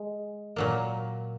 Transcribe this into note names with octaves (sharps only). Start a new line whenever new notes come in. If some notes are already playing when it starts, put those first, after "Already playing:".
Already playing: G#3
A#2 F#3 A#3